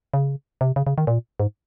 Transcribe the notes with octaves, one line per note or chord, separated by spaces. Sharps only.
C#3
C3
C#3
C#3
D#3
A#2
G#2